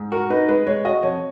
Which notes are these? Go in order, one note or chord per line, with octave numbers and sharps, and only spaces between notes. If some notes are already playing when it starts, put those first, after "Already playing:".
Already playing: G#2
F#4 A#4
D#4 B4
G#3 B4
G#3 C#5
F#4 D#5
F2 C#5